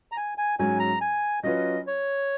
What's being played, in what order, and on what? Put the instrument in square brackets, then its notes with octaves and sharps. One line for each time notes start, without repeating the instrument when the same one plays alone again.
[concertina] A#5
G#5
G#5
[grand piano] G#2 F#3 C#4 [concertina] G#5
[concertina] A#5
G#5
[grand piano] F#3 C#4 F4 B4 [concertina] D#5
[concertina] C#5